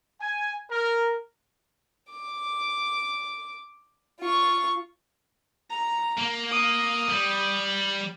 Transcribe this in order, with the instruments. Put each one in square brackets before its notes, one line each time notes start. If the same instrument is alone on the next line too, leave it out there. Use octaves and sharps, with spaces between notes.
[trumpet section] G#5
A#4
[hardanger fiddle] D6
F4 C#6
[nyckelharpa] A#5
[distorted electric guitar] A#3
[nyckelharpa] D#6
[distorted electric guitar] G3